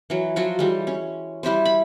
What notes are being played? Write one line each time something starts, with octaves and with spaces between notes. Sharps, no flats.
E3 F#3
F3 F#3 F4 F#4
E3 G3 G#3
C#4
G3 E4 G4 C5
B5